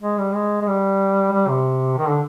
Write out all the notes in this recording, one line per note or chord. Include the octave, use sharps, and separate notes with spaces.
G#3
G3
G#3
G#3
G3
G3
C3
D#3
D3